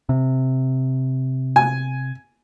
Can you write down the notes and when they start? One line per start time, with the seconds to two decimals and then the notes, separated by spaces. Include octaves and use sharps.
0.09 C3
1.56 G#5